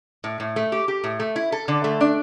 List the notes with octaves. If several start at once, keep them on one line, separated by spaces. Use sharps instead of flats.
A2
A2
A3
G4
G4
A2
A3
E4
A4
D3
A3
D4